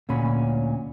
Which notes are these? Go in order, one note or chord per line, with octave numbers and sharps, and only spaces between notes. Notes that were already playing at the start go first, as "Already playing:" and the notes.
D2 A#2 C#4 B5